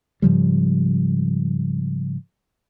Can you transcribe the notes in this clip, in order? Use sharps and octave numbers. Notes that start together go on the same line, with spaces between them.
G#2 C#3 F3 G3